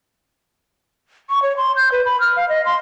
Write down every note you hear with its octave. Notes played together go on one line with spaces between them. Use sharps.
C#6
C#5
C6
G6
B4
B5
F6
F5
D#5
C6